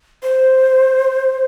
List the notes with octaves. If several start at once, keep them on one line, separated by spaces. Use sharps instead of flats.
C5